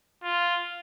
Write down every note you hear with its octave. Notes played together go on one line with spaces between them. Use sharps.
F4